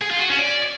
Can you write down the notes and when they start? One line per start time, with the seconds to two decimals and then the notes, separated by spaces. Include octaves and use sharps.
0.01 G#4
0.11 F4
0.20 F#4
0.30 C#4
0.39 D5